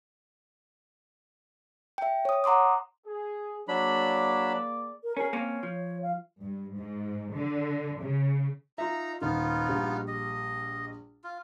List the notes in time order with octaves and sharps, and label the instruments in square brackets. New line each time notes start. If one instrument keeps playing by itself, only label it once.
[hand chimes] E5 G5
C#5 D#6
F#5 A#5 C6 D6 D#6
[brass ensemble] G#4
[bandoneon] F#3 D4 B5 [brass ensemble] A#3 G#4 D5
[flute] A#4
[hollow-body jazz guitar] C#4 G#4 [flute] A#4
[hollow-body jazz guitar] A#3 C4 C#4 [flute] C#5
[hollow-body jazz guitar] F3
[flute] F5
[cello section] G2
G#2
D3
C#3
[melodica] D#4 A#5 [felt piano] F4 E5
[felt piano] D#1 D#3 [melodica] B3 D#4 F4
[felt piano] A#1 G3
[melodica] D#5
F4